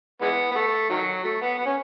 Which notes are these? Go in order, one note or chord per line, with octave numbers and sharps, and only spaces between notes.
E3 G#3 B3
B3
A3
D#3 F#3
A3
B3
B3
C#4